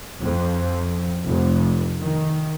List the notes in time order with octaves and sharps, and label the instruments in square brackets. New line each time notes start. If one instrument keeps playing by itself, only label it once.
[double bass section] F2
F1
D#3